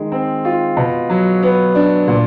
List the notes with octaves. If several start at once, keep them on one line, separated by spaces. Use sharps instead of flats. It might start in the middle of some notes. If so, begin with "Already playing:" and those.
Already playing: D#3 G#3
C4
F4
B2
F#3
B3
D4
A#2